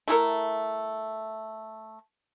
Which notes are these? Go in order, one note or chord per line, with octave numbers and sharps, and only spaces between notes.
A3 E4 A4 A#4